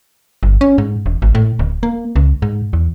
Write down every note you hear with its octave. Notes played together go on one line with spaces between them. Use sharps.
G1
C#4
G#2
E1
G#1
A2
D1
A#3
C#2
G#2
E2